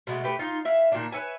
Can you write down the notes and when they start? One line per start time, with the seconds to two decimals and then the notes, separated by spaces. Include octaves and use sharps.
0.07 B2 G#3 A3
0.23 A3 G4 B4
0.39 D#4 F4
0.65 E4 E5 F5
0.92 A#2 D#3 A#3 D4
1.12 B4 C#5 E5 G#5